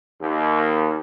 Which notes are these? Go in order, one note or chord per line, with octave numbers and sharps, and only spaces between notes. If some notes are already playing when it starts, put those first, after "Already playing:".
D#2